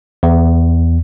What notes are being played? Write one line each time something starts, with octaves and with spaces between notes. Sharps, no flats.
E2